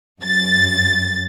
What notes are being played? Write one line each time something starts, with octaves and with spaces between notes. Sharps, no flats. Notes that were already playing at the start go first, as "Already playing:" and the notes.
F#2 A6